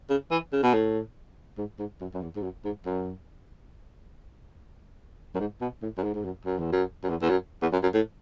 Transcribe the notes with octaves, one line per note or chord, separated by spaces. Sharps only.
C#3
E3
C#3
B2
A2
G#2
G#2
F#2
F#2
E2
G#2
F#2
G#2
F#2
F#2
G#2
B2
A2
F#2
G#2
G#2
F#2
F#2
E2
F#2
F#2
E2
E2
F#2
E2
F#2
F#2
A2